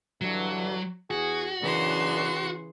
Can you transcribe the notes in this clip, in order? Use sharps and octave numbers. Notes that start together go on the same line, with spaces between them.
G2 D3 E3 F#3
E2 F#4 G#4
F#2 A#2 C#3 E3 D4 C6